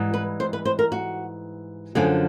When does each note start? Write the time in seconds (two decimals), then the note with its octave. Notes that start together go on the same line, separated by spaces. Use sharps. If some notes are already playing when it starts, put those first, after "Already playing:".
Already playing: G#2 E3 G3
0.14 B4
0.40 C5
0.53 B4
0.65 C5
0.79 A#4
0.92 F#4
1.95 F#2 D3 F3 G#4